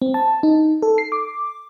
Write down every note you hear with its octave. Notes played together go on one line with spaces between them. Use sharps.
C4
A5
D#4
A4
C7
D6